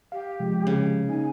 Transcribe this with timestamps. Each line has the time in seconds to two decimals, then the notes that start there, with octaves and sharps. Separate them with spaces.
0.12 G4 F5
0.40 C3 F3 G#3
0.67 C#3
1.09 A#3 D#4 G#5